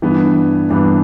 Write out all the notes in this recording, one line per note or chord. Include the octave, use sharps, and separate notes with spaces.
G2 E3 B3 D4
G2 E3 B3 D4